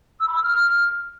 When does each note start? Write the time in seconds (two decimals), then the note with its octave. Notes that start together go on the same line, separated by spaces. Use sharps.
0.19 E6
0.27 B5
0.35 E6
0.43 F6